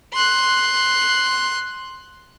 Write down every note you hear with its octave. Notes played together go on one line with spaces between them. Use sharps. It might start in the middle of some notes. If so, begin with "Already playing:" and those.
C6 F#6